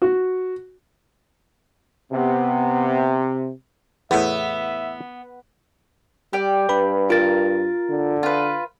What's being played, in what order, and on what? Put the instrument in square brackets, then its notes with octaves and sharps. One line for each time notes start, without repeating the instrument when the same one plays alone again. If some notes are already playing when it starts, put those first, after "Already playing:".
[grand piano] F#4
[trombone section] C3 [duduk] B3
[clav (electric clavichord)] E2 A2 [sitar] B3 [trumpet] E5
[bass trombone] G3 [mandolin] G4 D5
[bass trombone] G2 [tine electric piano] B4 B5
[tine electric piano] F4 A6 [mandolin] A#4
[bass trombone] D3
[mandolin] F4 B4